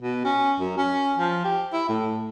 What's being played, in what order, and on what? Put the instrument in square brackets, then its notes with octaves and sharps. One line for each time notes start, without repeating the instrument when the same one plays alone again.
[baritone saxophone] B2
C#4
F#2
C#4
F3
G4
E4
A2